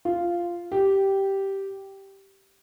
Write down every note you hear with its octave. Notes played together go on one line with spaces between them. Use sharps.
F4
G4